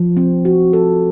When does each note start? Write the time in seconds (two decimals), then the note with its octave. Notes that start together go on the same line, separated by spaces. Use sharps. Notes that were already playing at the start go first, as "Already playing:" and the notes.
Already playing: F3
0.17 C4
0.45 F#4
0.73 A4